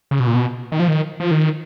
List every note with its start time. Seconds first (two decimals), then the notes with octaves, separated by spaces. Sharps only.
0.11 C#3
0.20 B2
0.27 A#2
0.35 B2
0.72 D#3
0.79 F3
0.88 D#3
1.20 F3
1.31 D#3